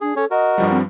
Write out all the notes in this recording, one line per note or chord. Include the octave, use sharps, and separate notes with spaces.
D4 G#4
C#4 A4 C#5
F#4 A#4 D#5
G2 F3 G3
C4